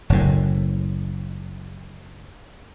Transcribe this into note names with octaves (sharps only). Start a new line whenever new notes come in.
F#1 A2